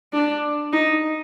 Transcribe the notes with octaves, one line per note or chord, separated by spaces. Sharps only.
D4
D#4